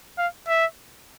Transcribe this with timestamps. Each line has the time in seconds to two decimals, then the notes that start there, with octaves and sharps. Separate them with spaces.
0.18 F5
0.48 E5